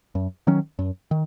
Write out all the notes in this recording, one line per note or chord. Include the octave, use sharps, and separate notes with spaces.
F#2
D#3 F#3 C#4
F#2
D#3